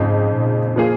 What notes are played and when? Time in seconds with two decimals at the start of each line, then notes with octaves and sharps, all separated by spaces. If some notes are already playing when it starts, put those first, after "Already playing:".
Already playing: F2 G#2 C#3 F3 C4 D#4
0.32 A#2
0.76 F3 A#3 F4 G#4